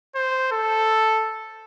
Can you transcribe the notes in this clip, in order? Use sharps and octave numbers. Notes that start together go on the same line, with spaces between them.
C5
A4